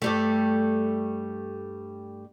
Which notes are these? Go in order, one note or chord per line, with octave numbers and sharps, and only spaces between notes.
G2 G3 A3